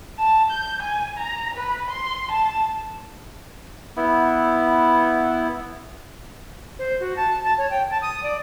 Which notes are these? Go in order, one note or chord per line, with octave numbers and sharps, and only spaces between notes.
A5
G6
G#5
A#5
B4
C6
A5
B3 E4
C5
F#4
A5
A5
C#5
G5
A5
D#6
D5